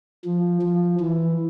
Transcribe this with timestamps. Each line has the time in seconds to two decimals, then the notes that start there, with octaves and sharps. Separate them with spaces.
0.25 F3
0.62 F3
1.00 E3